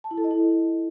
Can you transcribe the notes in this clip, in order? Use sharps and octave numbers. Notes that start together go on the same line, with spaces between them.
A5
E4
A4
D#5
E4